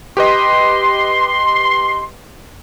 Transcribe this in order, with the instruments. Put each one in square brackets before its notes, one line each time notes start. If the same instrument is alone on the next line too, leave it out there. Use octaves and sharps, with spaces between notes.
[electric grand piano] G4 B4 D#5 [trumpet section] C6